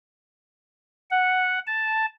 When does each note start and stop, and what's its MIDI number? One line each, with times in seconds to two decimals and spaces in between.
1.11 1.59 78
1.67 2.06 81